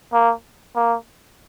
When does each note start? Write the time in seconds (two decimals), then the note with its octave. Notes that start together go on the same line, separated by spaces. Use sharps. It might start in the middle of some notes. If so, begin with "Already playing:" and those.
0.13 A#3
0.76 A#3